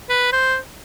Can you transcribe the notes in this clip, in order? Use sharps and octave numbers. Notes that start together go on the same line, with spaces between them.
B4
C5